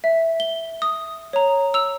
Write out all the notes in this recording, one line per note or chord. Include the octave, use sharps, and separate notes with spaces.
E5
G7
D#6
C#5 A#5
E6 F7